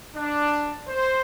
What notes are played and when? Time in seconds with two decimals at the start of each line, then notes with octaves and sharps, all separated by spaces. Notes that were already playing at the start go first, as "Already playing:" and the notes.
0.15 D4
0.87 C5